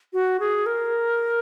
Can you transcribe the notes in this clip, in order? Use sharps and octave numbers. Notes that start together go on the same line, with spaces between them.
F#4
G#4
A#4